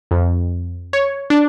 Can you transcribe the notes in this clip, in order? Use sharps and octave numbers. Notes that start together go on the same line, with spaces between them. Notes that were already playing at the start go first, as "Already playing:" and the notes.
F2
C#5
D4